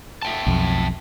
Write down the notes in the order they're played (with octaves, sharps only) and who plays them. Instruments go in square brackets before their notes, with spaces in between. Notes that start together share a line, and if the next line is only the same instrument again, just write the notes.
[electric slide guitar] E5 G5 A5
[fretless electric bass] B1 F2